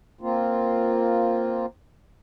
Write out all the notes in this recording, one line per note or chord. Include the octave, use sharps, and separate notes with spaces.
A#3 C4 F4